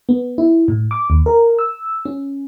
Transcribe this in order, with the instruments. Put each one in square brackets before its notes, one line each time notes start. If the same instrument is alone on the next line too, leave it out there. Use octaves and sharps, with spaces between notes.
[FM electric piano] B3
E4
A2
D6
D#2
A#4
E6
C#4